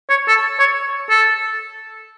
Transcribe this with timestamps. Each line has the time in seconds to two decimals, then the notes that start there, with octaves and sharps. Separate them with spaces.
0.09 C#5
0.28 A4
0.59 C#5
1.10 A4